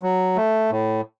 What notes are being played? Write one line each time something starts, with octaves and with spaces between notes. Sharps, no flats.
F#3
A3
A2